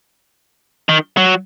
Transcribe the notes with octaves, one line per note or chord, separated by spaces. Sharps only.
D#3
F#3